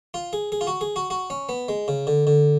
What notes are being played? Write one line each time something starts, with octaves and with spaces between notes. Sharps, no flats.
F4
G#4
G#4
F4
F#4
G#4
F#4
F#4
C#4
B3
G#3
C#3
D3
D3